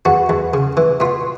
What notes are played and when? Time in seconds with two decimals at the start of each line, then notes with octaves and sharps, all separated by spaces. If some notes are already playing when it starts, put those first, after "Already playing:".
0.05 E2 F#4
0.29 E2
0.54 C#3
0.77 E3
1.00 B2 F4